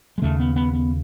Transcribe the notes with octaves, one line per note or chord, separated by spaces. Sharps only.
G#3
D#2 C#3 A3
B3
B3
B3